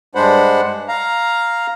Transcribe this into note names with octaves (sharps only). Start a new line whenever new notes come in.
G2 G#3 D4 C5 F#5 B5
F5 A#5